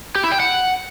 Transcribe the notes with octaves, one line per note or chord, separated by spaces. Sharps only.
G4
E4
G5
F#5